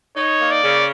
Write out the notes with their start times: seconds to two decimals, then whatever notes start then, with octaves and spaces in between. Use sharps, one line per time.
0.16 D#4 C#5
0.40 A#3
0.51 D5
0.62 C#3